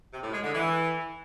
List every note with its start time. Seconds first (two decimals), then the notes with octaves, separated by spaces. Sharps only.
0.13 C3
0.23 A2
0.33 G#3
0.44 D3
0.54 E3